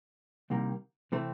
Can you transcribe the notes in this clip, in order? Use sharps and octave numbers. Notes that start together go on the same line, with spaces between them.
C2 C3 D#3 G3 A#3
C3 E3 A3 C4